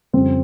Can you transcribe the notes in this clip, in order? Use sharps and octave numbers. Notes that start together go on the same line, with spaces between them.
F2 C#3 G3 C4